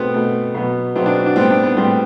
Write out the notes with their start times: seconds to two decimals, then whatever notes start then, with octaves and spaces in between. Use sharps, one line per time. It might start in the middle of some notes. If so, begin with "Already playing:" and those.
Already playing: B2 A3 B3 C4
0.14 B2 A3
0.54 B2 F#3 B3
0.95 B2 F#3 B3 C4
1.06 D4
1.16 F#4
1.26 D4
1.36 A2 G3 B3 C4
1.50 D4
1.63 B3
1.77 A2 G3 B3 C4